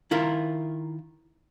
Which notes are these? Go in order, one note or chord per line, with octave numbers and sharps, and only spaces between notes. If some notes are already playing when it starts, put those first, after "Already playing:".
D#3 E4 F4 A#4